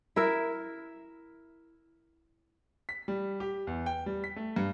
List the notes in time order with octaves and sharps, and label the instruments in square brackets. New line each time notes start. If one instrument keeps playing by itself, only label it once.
[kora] E4 A#4 E5
[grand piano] B6
G3
G4
E2
G5
G3
B6
A3
G2